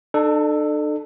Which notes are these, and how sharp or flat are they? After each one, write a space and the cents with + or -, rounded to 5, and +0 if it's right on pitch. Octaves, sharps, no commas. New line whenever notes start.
D4 +45 A4 +0